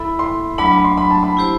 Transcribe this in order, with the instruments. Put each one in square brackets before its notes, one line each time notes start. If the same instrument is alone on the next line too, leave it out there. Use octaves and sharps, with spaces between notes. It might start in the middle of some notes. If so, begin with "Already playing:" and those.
Already playing: [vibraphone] E4 A4 E5 [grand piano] B5
[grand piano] C6
[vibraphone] F#3 A3 D4 [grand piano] B5
[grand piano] B5
C6
B5
A5
B5
[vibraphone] E4 G4 C5